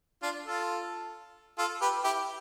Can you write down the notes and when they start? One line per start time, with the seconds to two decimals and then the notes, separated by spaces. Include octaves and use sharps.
0.23 D4 F4
0.45 F4 A4
1.58 F4 A4
1.81 G4 B4
2.04 E4 G4